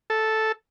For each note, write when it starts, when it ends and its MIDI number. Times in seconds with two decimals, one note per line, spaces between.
0.10 0.52 69